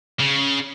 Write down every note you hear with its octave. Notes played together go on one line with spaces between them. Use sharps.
C#3